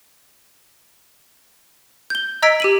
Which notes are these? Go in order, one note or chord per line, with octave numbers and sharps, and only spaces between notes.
G6 G7
D#5 A#5 E6 G#6 B6 D7
G4 D#7 F#7